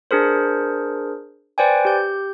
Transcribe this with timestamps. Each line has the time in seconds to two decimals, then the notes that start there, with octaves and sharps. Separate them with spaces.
0.11 D4 G#4 A#4 C5
1.58 B4 C5 D5 G5 G#5
1.85 G4 G6